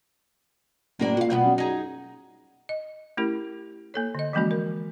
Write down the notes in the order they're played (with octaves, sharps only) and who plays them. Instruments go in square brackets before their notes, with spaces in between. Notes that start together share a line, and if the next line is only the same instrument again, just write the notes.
[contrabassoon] F#1 [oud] A2 A#3 D4
[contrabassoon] A#2 [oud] F#4 F5
[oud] B2 G3 B3
[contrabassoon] F#2
[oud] D#4 G#4
[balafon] D#5
A3 C#4 E4 G4 A#4
A#3 A4 C#5
D3 D#5
E3 F3 G#3 A#3 C#4 F#4
A#4